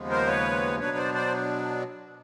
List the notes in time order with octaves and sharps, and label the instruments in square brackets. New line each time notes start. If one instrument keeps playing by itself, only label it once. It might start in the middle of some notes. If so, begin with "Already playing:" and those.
Already playing: [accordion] D#2 C#3 F3 G#3 B3
A#4 C5
B4 C#5
B2 F#3 B3 D4 B4 C#5
C5 D5
C5 D5